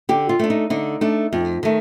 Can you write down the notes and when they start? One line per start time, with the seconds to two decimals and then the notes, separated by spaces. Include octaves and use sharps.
0.09 D3 G4
0.29 F4
0.39 A3 D4
0.50 D#4
0.70 D3 D#4
1.01 A3 D4
1.33 F2
1.63 D#3 A3